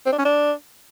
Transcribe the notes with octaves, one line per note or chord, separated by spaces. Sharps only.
C4
D4
C#4
D4